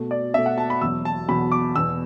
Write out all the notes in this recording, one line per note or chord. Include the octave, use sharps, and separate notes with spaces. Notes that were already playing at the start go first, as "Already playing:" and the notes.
Already playing: B2 A3
D5
B2 A3 E5
F#5
A5
B5
E2 B2 F#3 E6
A5
E2 B2 F#3 B5
D6
E2 B2 B3 E6